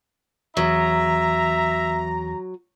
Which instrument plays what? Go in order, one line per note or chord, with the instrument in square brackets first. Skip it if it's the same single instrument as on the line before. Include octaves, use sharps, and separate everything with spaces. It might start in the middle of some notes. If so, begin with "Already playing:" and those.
[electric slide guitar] E2 [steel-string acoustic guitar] F#3 [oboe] E5 [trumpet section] A#5